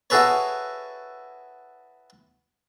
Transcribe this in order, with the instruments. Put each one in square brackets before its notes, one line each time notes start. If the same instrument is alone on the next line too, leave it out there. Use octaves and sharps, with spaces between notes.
[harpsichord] E4 F#4 G#4 A4 B4 C#5